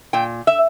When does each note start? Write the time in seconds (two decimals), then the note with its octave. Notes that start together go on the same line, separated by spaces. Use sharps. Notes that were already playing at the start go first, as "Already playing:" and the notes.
0.13 A#2 G5
0.47 E5